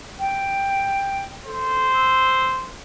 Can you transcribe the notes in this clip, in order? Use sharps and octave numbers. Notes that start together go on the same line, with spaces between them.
G5
A4 C5
E6